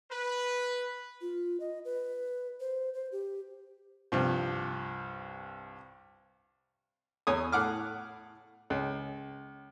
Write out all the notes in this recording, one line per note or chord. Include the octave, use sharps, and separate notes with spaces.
B4
F4
D#5
B4
C5
C5
G4
C2 G2 F3
E2 C#5 G#5 C#6 D#6
A2 F#5 D6 F6
C#2